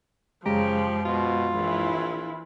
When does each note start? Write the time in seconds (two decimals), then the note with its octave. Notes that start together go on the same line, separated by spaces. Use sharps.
0.46 F#2 C#3 F3 G#3 G4 A#5
1.05 B2 F4
1.53 A#1 E3 E4